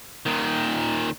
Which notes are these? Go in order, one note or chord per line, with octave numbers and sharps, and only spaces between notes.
A#2 D#3